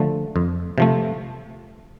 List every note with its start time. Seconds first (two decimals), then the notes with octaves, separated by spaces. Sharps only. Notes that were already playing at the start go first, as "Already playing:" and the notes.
Already playing: D3 F3 A3
0.36 F2
0.78 C3 F3 A3